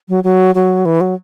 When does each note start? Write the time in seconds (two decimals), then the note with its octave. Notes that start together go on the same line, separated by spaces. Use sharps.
0.09 F#3
0.24 F#3
0.55 F#3
0.85 E3
1.01 F#3